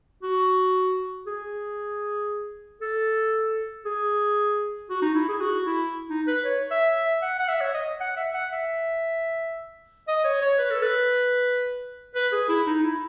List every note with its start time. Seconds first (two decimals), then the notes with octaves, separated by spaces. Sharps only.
0.23 F#4
1.27 G#4
2.82 A4
3.85 G#4
4.90 F#4
5.02 D#4
5.15 E4
5.29 G#4
5.41 F#4
5.67 E4
6.10 D#4
6.27 B4
6.45 C#5
6.71 E5
6.96 E5
7.22 F#5
7.40 F#5
7.49 E5
7.61 C#5
7.74 D#5
8.00 F#5
8.17 E5
8.34 F#5
8.53 E5
10.08 D#5
10.25 C#5
10.41 C#5
10.59 B4
10.71 A4
10.82 B4
12.15 B4
12.32 G#4
12.49 E4
12.67 D#4
12.84 E4